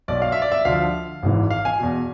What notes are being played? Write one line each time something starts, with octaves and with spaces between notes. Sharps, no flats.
B1 B2 D5
F5
E5
D5
E5
D2 D3 F3 F5
G#1 G#2 E3
F5
G#5
E2 B2